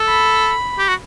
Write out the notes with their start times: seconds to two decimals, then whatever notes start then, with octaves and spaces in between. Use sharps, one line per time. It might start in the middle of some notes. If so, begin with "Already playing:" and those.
Already playing: A4
0.08 B5
0.79 G4
0.88 F#4